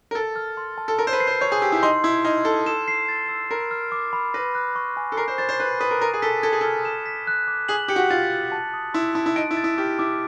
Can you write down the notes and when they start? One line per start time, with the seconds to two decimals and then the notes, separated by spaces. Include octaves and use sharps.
0.11 A#4
0.15 A4 A6
0.36 F6
0.57 C6
0.78 A5
0.88 A4
0.98 A#4 E6
1.07 C5
1.13 B4
1.20 C7
1.27 C5
1.41 C#5 G6
1.52 G#4
1.62 G4 E6
1.72 E4
1.83 D#4 C6
2.04 E4 G#6
2.25 D#4 F6
2.45 A4 C6
2.66 A4 E7
2.88 C7
3.08 A6
3.29 E6
3.50 A#4 B5
3.71 F6
3.92 D6
4.13 B5
4.34 B4 A#6
4.55 F#6
4.76 C#6
4.97 G#5
5.12 A4
5.17 A#4 C7
5.28 C5
5.38 C5 A6
5.49 C5
5.60 B4 F#6
5.80 B4 D#6
5.91 A#4
6.01 A#4 D#7
6.14 G#4
6.22 A4 B6
6.43 A4 G#6
6.52 G#4
6.61 A4 F6
6.85 E7
7.06 B6
7.27 F#6
7.48 D6
7.68 G#4 F#7
7.88 G4 C#7
7.96 F#4
8.10 F4 A6
8.31 F#6
8.52 A5
8.74 D#6
8.94 E4 C6
9.15 E4 A5
9.26 E4
9.36 D#4 D7
9.51 E4
9.57 A6
9.64 E4
9.78 G4 F6
9.99 E4 D6